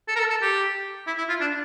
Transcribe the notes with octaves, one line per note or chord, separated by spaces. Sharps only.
A4
A#4
A4
A4
G4
E4
E4
F4
D4